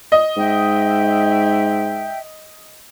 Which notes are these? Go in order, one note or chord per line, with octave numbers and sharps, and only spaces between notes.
D#5
G#2 E5 G5